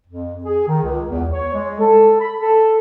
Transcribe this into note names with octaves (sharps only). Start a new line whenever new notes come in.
F2
G#4
D#3
C#2
E2
C#5
G#3
A4
B5
A4